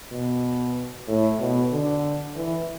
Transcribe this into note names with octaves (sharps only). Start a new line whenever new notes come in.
B2
A2
B2
D3
E3